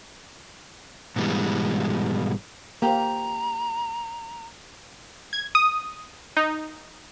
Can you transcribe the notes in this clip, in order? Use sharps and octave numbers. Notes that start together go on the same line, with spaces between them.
G#2 B2 E3 G3 G#3
A#3 G4 C5 A#5
G#6
D#6
D#4